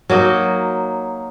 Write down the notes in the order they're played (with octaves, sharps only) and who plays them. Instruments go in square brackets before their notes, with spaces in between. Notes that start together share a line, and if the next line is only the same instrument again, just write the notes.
[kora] F#3 A#3 D#4 D#5